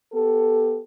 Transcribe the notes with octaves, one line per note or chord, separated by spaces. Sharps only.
B3 G4 A4